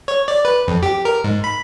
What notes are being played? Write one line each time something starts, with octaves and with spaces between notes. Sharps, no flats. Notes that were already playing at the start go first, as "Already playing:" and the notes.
C#5
D5
B4
F2
G4
A#4
G#2
B5